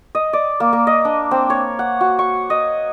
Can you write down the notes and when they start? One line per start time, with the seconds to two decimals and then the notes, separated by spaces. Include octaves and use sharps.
0.15 D#5
0.33 D5
0.60 A#3
0.73 A#3
0.87 D#5
1.05 D4
1.31 C4
1.50 C#5
1.79 F#5
2.01 F#4
2.19 C#6
2.50 D#5